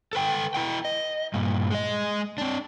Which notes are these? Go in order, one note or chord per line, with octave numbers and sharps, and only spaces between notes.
A4 B4 G5
E4 B4 G5
D#5
G2 A#2
G#3 D#5
C4 D4